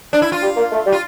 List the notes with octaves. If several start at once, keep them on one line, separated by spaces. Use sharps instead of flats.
D4
E4
F4
G3
A#3
A3
G3
F4